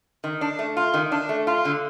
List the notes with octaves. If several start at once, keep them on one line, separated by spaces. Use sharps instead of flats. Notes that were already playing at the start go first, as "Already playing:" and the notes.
D#3
D4
A3
F4
D#3
D4
A3
F4
D3